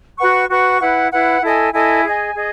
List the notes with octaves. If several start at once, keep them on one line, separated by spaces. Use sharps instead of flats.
F#4 B4 F#5 C#6
F#4 B4 F#5 C#6
E4 B4 F#5
E4 B4 F#5
E4 A4 D#5 G#5
E4 A4 D#5 G#5
G#4 D#5 G#5
G#4 D#5